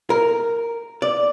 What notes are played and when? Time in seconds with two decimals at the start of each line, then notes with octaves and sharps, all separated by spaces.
0.10 A#4
1.02 D5